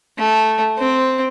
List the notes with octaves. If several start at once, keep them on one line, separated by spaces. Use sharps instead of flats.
A3
C4